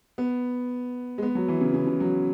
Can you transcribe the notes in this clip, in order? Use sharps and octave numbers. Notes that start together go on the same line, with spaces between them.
B3
G#3
B3
F#3
E3
C#3
C#3
C#3
F#3